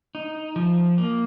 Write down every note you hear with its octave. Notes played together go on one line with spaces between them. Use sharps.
D#4
F3
A#3